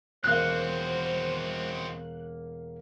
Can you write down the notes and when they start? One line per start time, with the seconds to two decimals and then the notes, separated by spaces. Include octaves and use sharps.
0.24 E1 A#3 C4 F#4 C5 F5 F#6